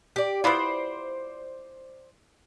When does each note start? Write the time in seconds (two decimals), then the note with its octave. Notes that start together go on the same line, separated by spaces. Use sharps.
0.16 G4 D5
0.44 B3 E4 F4 C5 D5